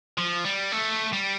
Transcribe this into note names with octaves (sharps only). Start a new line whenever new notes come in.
F3
G3
A3
G3